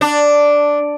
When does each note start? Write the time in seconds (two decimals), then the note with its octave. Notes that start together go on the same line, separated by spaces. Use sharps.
0.01 D4